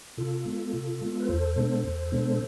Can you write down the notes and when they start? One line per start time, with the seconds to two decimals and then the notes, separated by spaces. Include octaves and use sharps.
0.18 C3 F4 A4
0.45 G#3 B3
0.73 C3
1.01 G#3 B3
1.20 B4
1.28 E2 A4 C5
1.56 B2 G#3 B3 D4
1.84 E2
2.12 B2 G#3 B3 D4